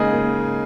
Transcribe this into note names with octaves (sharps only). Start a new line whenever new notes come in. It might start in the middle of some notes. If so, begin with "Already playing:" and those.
Already playing: C#3 G#3 A#3 D#4 G#4
A#3